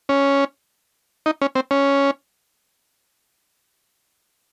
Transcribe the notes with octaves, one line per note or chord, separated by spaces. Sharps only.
C#4
D#4
C#4
C4
C#4